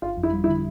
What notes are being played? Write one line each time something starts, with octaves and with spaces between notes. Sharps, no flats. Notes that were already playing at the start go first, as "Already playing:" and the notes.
G1 F4
F2
E4
G3
E4
D3